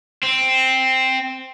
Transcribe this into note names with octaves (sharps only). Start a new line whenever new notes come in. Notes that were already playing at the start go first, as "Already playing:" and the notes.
C4